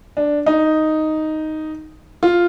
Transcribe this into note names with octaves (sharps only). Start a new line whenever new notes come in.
D4
D#4
F4